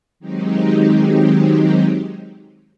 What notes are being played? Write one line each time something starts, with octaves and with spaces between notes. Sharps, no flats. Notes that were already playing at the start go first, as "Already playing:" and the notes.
D#3 F#3 G#3 C4 D#4 G4